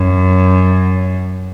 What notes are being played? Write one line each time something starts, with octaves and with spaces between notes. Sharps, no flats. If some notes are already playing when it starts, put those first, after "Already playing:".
Already playing: F#2